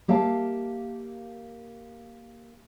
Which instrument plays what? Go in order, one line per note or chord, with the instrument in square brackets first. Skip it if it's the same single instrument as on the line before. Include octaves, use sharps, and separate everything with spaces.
[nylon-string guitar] A#3 G4 E5 F5 A5